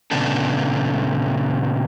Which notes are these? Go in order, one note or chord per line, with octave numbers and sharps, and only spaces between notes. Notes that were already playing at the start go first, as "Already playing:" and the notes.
A#2 C#3 A3 B3 D4 A4